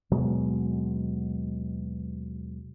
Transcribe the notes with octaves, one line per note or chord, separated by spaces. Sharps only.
D#2 B2 F#3 G#3